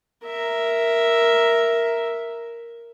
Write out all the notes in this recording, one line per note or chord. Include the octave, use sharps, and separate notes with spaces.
A#4 E5